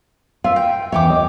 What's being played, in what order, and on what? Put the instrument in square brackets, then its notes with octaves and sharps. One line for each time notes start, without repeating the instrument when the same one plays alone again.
[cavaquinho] F4 E5 [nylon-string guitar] F5
[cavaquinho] G5
[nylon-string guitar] E2 E5 [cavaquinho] C#5 G5 D6
[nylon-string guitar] D#5